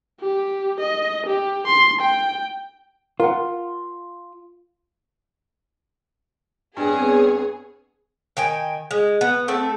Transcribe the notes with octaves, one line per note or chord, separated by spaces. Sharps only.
G4
D#5
G4
C6
G5
F4 A#4 F#5
G2 B3 C4 G#4 C#5
D#3 G5 G#5
G#3
B3
A3 C4 A4 E5